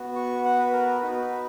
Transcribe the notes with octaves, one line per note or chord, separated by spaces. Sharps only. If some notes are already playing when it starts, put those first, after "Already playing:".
Already playing: B3 F#4
C#6
F#5
B4
A#4
B3 D#4 F#4 B4